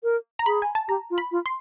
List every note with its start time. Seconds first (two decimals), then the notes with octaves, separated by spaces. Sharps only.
0.03 A#4
0.39 A#5
0.46 G#4 B5
0.62 G#5
0.75 A5
0.88 G4 A#5
1.10 F4
1.18 B5
1.32 F4
1.46 C6